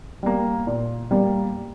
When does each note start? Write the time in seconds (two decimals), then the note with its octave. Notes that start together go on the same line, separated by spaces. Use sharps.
0.23 G3 A#3
0.67 A#2
1.11 G3 A#3